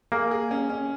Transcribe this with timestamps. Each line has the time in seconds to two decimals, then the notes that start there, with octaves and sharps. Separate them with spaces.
0.12 A#3 G#4
0.31 G#4
0.51 C#4
0.70 C#4